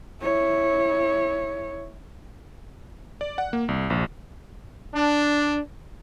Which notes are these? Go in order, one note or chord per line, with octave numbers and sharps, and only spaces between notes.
E4 C#5
D5
F#5
A#3
C2
A#1
D4